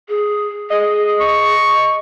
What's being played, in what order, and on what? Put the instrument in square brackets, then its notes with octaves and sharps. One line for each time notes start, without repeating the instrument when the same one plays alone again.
[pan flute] G#4
[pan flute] G#4 [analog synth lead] D#5
[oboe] C#6